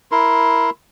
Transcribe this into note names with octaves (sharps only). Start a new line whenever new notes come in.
E4 A#4 C6